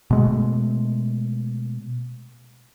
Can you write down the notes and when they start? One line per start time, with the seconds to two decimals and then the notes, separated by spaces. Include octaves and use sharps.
0.10 B2 G#3 A3